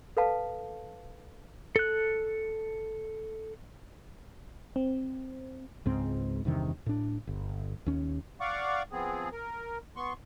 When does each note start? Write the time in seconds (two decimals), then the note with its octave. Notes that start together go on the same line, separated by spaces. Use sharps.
0.17 A4 B4 F5 A5
1.76 A4 F#6
4.76 C4
5.86 C#2 G#2 C4
6.45 E2 G2 C3 D#3
6.86 A2 D4
7.27 G1
7.86 D#2 C#4
8.41 D5 F5 F#5 C#6 D6
8.92 F3 B3 C4 G#4
9.32 A#4
9.96 B3 C6 C#6